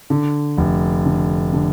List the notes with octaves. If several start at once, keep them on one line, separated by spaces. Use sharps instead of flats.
D3
F1
D3
D3